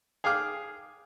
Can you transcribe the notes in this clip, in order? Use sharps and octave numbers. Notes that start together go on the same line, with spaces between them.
G#4 F5 G5 D6 F6